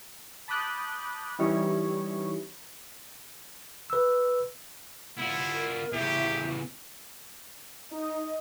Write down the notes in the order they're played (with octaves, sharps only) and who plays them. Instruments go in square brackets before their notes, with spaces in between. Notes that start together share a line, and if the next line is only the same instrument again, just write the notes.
[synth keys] A5 B5 D6 D#6 F#6 G6
E3 G3 C#4 D#4 E4 C#5
[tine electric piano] B4 E6
[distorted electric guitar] B3 F4 [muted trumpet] E4
[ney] A#4
[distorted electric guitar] E2 C#3 [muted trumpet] G4 [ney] E5
[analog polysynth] D#4 [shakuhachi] D#5